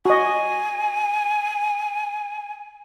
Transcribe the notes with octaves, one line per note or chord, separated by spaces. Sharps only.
F#4 D#5 G#5